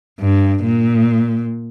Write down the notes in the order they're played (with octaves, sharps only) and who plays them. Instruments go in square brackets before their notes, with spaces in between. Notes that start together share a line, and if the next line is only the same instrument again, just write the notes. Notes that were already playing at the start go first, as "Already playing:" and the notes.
[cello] G2
A#2